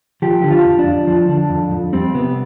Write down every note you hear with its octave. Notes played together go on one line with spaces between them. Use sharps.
F3 G4
D3
F4
F2
D4
F2
F3
D3
F2
F2
G3 C4
C3 B3